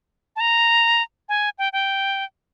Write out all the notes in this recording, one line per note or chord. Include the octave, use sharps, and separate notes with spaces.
A5
A#5
G#5
G5
G5